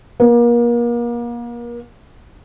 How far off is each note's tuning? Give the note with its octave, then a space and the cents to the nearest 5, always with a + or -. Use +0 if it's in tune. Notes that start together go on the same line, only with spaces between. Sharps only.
A#3 +35